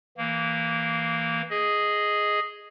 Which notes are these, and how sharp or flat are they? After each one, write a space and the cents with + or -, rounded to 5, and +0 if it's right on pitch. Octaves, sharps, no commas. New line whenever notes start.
E3 +0 A#3 -10
G#4 +0 D#5 +0